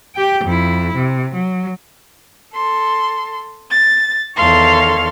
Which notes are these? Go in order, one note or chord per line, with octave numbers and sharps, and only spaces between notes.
G4 G5
F2 E4
C3
F#3
A4 C6
A6
E2 D#3 A4 C#5 F5 C6